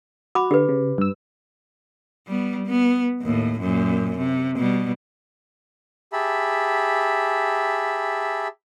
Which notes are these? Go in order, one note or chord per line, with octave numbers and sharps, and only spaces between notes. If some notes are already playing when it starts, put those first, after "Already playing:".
F#4 B5 D6
D3 G4 B4
C#3
G2 E6
G3 B3
B3
D#2 A2
F#2 A#2
C3
B2 G3
G4 G#4 E5 A5 B5